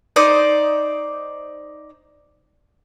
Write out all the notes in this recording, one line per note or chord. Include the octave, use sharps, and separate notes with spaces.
D#4 C5 D5 D#6